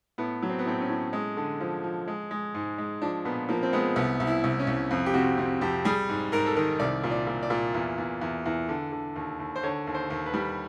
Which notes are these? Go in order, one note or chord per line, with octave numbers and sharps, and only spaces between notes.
A2 B3
F#3
C4
B3
A2 C4
C#4
A2
G#3
D3
F3
F3
G#3
G#3
G#2
G#3
F3 D4
A#2 B3
F3 A#3
C4
G#3 B3
C2 B3
C2
E4
C2
C#4
C2
F2
G4
C3 F#4
C3
F2 G4
G3 G#4
G#2
G#2 A#4
A4
D#3 A#4
C2 D5
A#2
D5
A#2
D5
A#2
E2
E2
E2
E2
D3
D3
D#2
D#2
C5
D3 C#5
D#2
C5
D#2
B4
G3